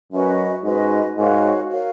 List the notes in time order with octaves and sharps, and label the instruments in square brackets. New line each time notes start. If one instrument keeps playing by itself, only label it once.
[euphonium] F#2 [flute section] C#4 F#4 B4 D#5
[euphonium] G#2 [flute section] C#4 F#4 B4 D#5
[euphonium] G#2 [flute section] F#4 A#4 C#5 F5
[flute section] F#4 A#4 C#5 F5